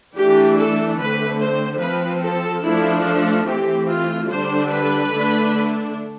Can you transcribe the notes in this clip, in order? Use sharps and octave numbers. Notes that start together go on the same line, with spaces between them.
E3 A3 D4 G4
A4
D3 A3 C4 B4
C5
F3 C4 B4
A4
F3 A3 D4 E4
A4
E3 A3 C4 G4
F4
D3 G3 D4 C5
B4
D3 A3 D4